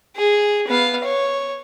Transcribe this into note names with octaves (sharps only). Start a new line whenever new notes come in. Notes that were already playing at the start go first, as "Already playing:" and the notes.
G#4
B3 F5
C#5